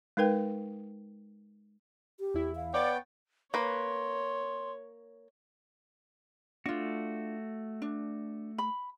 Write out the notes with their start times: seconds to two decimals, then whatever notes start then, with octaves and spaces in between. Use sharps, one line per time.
0.17 G#3 D#4 A#4 B4 G5
2.20 G4
2.34 E2 E4
2.56 F5
2.74 B3 C#5 D5 G5 A6
3.54 A#3 B4 C#5 C6
6.66 A3 D4 F4 F#4
7.82 D4
8.58 B5